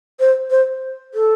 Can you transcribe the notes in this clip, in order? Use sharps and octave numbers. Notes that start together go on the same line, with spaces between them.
C5
C5
A4